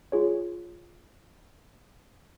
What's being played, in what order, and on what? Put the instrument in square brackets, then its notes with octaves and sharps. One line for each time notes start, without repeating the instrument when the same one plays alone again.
[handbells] F4 G#4 C#5